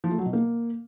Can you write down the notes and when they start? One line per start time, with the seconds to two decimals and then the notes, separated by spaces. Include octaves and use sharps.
0.04 F3
0.11 A3
0.18 F#3
0.26 B2
0.33 A#3